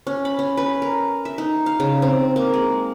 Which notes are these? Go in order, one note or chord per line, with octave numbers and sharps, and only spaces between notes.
C#4
B5
C#4
B4
A#4
E5
D#4
F5
C#3
C4
A#3
G#3